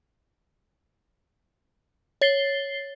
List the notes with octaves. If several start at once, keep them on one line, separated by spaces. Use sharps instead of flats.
C#5 A6 C7 G7